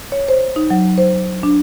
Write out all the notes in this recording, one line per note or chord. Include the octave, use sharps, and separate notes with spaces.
C#5
C5
D#4
F#3
C5
D4